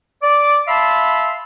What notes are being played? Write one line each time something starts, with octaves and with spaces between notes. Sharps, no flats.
D5 D6
E5 F5 A5 B5 C6 E6